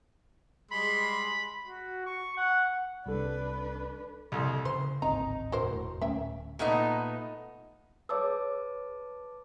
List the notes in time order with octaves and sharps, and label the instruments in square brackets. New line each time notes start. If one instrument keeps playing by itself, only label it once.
[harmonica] G3 G#3 C6 [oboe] B5
[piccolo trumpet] F#4
C#6
F#5
[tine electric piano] C2 A4 [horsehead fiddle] D4 B4
[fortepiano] C2 F2
[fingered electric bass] C#3 [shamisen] C5 [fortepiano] C6
[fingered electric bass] D1 G#1 C4 [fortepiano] D#4 [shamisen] A#5
[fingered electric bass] A2 D4 [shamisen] F#4 A#4 C5
[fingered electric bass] E1 A2
[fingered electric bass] D1 A3 [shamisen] C#4 E5 G5
[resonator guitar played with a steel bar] A#2 A3 B3 D#4
[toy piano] G#4 C#5 E6 [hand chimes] B4 A5 D6